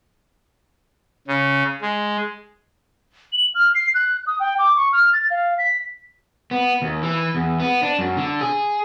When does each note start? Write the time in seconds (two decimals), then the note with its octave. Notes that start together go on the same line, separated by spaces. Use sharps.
1.28 C#3
1.82 G#3
3.33 F#7
3.55 F6
3.75 C7
3.94 F#6
4.27 D#6
4.40 G5
4.59 D6
4.76 C#6
4.93 F6
5.13 A6
5.30 F5
5.58 B6
6.51 B3
6.82 D#2
7.03 E3
7.35 E2
7.60 B3
7.83 D4
7.99 F#2
8.17 D3
8.41 G#4